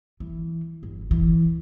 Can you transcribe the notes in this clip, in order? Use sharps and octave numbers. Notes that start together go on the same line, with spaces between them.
E3
G1
E3